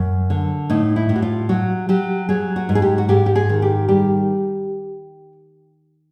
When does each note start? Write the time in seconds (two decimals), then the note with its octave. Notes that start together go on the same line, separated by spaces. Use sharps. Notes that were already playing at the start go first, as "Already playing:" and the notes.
Already playing: F#2
0.30 D3
0.70 A2 D#4
0.96 E4
1.09 A2
1.16 F#4
1.22 F4
1.49 F#3 F#4
1.89 F#3 G4
2.29 F#3 G#4
2.56 F#4
2.69 G#2
2.75 G#4
2.82 G4
2.98 F#4
3.09 G#2 G4
3.26 G4
3.35 G#4
3.49 D#3
3.62 G4
3.88 G3 G4